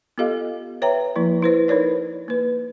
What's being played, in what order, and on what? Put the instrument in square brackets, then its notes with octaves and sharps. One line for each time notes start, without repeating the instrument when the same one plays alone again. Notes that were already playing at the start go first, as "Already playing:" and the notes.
[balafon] B3 F4 G4 A4 D#5 F5
B4 C#5 E5 G5 A#5
F3 A#3 E4 B4
E4 B4 C5
D#4 A#4 B4 C#5 D5
A#3 B4